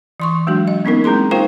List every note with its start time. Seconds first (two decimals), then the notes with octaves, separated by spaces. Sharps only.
0.20 E3 C6 C#6
0.47 F#3 G#3 D4 F#4
0.67 D#5
0.85 A#3 B3 C#4 D#4 A#4
1.04 G#3 C4 E4 G#4 C6
1.31 D#4 F4 A#4 C5 F5 G5